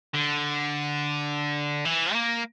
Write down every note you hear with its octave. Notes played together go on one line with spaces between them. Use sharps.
D3
E3
A#3